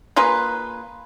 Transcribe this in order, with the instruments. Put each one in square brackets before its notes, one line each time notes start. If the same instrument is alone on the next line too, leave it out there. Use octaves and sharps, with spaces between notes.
[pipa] A#3 F4 G#4 B4